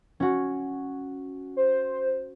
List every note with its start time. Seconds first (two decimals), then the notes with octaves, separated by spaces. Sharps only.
0.20 C#4 F#4
1.57 C5